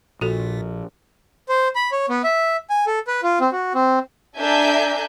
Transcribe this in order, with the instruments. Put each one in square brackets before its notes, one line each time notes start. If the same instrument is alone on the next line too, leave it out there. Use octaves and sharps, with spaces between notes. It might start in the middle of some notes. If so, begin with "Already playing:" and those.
[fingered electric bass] A#1 [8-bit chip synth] A#2 [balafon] F#4 A4
[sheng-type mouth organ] C5
B5
C#5
B3
E5
G#5
A4
B4
F4
C4
F#4
C4
[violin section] D4 A4 E5 G#5 A#5 G6